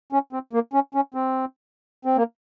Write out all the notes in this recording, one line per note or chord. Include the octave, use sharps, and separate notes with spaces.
C#4
C4
A#3
C#4
C#4
C4
C4
A#3